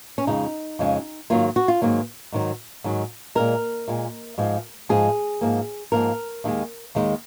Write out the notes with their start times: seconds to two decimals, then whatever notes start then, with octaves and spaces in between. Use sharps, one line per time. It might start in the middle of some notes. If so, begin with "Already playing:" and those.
0.18 C#4
0.27 F2 C#3 G#3 D#4
0.79 F2 C#3 G#3
1.30 G#2 D#3 F#3 A#3 F4
1.56 F#4
1.68 F4
1.81 G#2 D#3 F#3 A#3
2.32 G#2 D#3 F#3
2.84 G#2 D#3 F#3
3.35 A#2 G#3 A#4
3.88 A#2 G#3
4.38 G#2 F3 G#3
4.89 G#2 F3 G#3 G#4
5.41 G#2 F3 A#3
5.92 G#2 F3 A#3 A#4
6.44 D#2 D#3 G#3
6.95 D#2 D#3 G#3